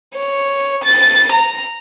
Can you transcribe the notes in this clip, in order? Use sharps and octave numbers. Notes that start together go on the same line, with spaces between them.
C#5
A6
A#5